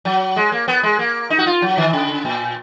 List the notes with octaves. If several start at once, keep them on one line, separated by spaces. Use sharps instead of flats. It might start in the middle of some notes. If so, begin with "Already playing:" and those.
F#3
G#3
A#3
B3
G#3
A#3
D#4
F#4
F4
F#3
D#3
C#3
A#2